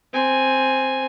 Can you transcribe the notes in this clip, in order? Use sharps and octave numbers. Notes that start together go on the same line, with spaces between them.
C4 G#5